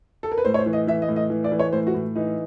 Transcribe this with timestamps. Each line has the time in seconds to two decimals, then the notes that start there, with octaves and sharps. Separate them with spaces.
0.23 A4
0.31 A#4
0.38 B4
0.45 A2 C5
0.54 C#5
0.59 C5
0.66 E3
0.73 D#5
0.87 E3 E5
1.02 D#5
1.09 A2
1.16 D#5
1.30 E3
1.44 D5
1.52 E3
1.59 C#5
1.73 A2 C5
1.87 F#4
1.94 A2
2.16 E3 D#4